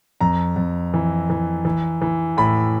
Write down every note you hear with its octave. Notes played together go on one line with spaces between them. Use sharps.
F2 A#5
F2
E3
E3
E3
E3
A2 B5